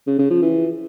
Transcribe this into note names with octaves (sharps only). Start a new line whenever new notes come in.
C#3
C#3
F3
E3